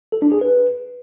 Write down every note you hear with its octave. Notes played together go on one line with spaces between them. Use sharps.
A4
D4
G#4
B4